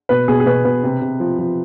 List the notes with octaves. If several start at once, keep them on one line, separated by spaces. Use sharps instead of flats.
B2 B4
B2 G#4
G#4
B2 B4
B2 B4
C3
C3
F3
F3